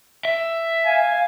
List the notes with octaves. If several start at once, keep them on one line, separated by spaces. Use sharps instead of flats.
E5
F5 G#5